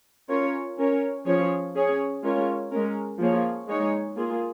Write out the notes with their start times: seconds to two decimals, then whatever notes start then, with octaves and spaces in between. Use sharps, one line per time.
0.29 C#4 F4 A#4 C#5
0.78 C#4 A#4 C#5
1.26 F3 C#4 G#4 C#5
1.75 C#4 G#4 C#5
2.23 G#3 C#4 F4 A#4 C#5
2.71 G#3 C#4 A#4
3.19 F3 A#3 F4 G#4 C#5
3.68 G#3 D#4 C#5
4.16 A#3 F4 G#4